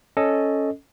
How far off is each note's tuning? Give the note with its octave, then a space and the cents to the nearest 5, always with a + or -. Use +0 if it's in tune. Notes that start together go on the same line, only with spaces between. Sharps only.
C#4 +0 A4 +0 D#5 +0